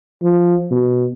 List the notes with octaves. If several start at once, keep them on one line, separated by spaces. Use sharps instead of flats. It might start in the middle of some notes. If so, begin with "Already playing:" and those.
F3
B2